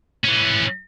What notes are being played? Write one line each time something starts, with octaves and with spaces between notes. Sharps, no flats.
E3 C#4